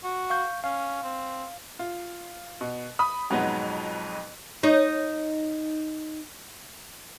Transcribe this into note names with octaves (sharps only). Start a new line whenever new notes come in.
F#4
F5 C#6 G6
C#4 F5
C4
F4
B2
B5 D#6
F2 G#2 B2 F#3 B3 D#4
D#4 C#5